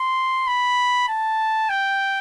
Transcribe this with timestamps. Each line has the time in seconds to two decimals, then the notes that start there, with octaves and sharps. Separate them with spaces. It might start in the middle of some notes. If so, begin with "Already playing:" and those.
Already playing: C6
0.47 B5
1.08 A5
1.69 G5